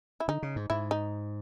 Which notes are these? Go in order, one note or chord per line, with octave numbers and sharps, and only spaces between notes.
E4
D3 D#4
C#3
G#2
G#2 E4
D#4